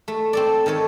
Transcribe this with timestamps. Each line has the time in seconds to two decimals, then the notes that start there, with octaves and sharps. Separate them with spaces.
0.08 A3
0.33 C4 A4 D5
0.66 D#3 A3 A4 C#5